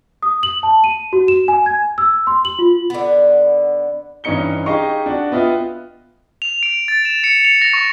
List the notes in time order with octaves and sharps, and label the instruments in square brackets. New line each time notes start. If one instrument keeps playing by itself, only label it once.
[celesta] D#6
F#7
A5
D#7
F#4
E7
G#5
G#6
E6
C6
F#7
F4
[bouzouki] D3 B3
[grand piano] G2 E3 C#4 D#4 C#7 G7
D#4 G4 G#4 D#5 F5 C#6
D4 F#4
B3 F4 D#5 E5 G5
[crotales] F7
D7
A6
E7
C#7
F7
A#6
C#6